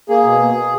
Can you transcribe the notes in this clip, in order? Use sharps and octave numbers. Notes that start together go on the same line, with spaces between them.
A#3 G#4
B2